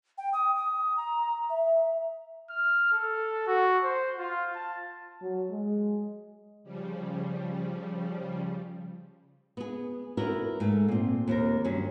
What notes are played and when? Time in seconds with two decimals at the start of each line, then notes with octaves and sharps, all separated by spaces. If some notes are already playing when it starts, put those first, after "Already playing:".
0.18 G5
0.33 D#6
0.56 D#6
0.97 A#5
1.50 E5
2.51 F6
2.92 A4
3.47 F#4
3.84 C5
4.18 F4
4.56 A5
5.22 F#3
5.51 G#3
6.63 C#3 F3 G3
9.57 B3 G#4
10.17 E4 F#4 A#4 B4 C#5
10.60 G#2 A3
10.88 A#2 C4
11.28 D#2 C3 A#4
11.64 G2 F#3 C#4